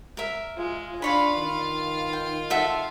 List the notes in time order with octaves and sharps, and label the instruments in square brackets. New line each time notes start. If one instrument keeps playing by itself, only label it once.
[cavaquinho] A#4 E5
[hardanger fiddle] G#3 [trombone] F4
[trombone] D4 [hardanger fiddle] F4 F5 [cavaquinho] B4 C#5 B5
[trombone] D#3
[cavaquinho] G5
A4 E5 F#5